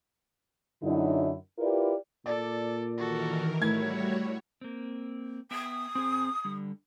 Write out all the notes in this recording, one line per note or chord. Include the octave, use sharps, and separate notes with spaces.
F#2 D3 F#3 D#4 E4
E4 F4 G4 A#4 B4 D5
A#2 A4 D5
D#3 E3 F#4 A4 A#4
A2 G3 A3 E4 F#4 C#5 G#6
A#3 C4
B3 E5 G5 D#6
C4 G#4
D3 G3